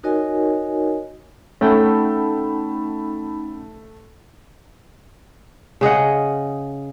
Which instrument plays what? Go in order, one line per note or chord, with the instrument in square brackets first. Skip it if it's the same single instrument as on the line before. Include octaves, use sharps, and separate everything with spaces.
[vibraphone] D#4 F#4 A#4 C#5 D#5 G#5
[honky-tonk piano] A3 [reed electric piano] C#4 F#5 G5 [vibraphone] D#4 B5
[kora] C#3 G#4 D#5 F#5